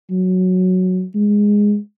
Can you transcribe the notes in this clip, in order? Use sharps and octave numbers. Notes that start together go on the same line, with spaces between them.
F#3
G#3